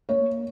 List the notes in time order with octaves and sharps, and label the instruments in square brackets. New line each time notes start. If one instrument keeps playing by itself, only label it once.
[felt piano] A#3 C#5